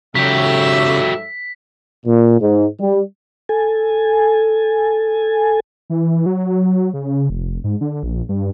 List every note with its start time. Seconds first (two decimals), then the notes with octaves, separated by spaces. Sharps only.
0.15 G#2 C#3 F#3 G4 A4 E5 B6
2.06 A#2
2.41 G#2
2.80 G3
3.49 A4 G#5
5.90 E3
6.26 F#3
6.94 C#3
7.30 F1
7.64 G#2
7.81 D3
8.03 A#1
8.29 G2